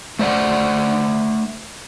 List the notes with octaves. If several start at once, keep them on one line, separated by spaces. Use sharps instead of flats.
A3 C5 D5 F#5